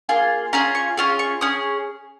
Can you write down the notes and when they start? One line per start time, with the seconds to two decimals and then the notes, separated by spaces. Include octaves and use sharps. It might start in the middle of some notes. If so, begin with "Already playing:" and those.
0.09 A#3 F4 G#4
0.53 C#4 F4 G#4 A#5
0.75 C#6
0.97 C#4 F4 G#4
1.19 C#6
1.41 C#4 G#4 D#6